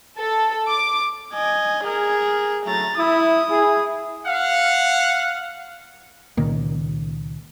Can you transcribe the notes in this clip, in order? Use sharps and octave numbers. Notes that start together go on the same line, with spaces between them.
A4
D6
D#5 G#5
G#4 A#4
F#3 A3 A#5 A6
E4 D#6
E4 G#4
F5 F#5
C#2 A#2 D#3 A#3